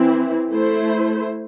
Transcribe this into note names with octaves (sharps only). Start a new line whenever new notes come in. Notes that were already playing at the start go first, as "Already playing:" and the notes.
Already playing: E3 C4 E4
A3 E4 C5